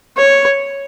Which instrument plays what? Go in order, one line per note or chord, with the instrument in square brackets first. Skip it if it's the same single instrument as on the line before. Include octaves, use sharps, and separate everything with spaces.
[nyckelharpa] C#5